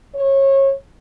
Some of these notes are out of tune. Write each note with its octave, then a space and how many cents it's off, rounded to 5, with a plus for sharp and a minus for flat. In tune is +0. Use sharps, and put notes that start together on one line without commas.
C#5 -25